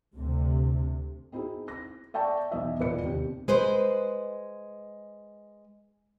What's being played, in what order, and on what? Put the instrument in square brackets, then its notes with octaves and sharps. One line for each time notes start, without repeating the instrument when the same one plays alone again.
[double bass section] D2 C3
[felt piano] C4 D#4 E4 F#4 G#4
A#6
D5 E5 G5 A5 C#6
B1 E2 D#5 E5
E1 A#2 B4 D5 D#5 C#7
D#2 C3 G4
[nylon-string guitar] G#3 B4 C5